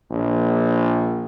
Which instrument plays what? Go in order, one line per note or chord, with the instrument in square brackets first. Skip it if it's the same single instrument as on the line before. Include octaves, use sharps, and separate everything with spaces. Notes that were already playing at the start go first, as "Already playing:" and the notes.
[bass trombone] A#1